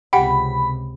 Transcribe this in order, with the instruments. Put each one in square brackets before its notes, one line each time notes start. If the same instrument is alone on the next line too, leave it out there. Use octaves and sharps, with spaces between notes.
[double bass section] C#2 C3 [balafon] G4 F#5 G5 [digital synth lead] B5